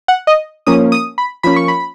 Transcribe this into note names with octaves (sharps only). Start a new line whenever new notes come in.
F#5
D#5
F3 A#3 C#4 D#6
D#6
B5
F3 A#3 C#4 B5
C#6
B5